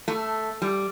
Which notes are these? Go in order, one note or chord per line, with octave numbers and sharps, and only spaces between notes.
A3
G3